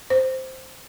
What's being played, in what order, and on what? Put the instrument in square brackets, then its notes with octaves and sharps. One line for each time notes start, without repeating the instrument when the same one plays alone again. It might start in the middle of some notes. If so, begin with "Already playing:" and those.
[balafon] C5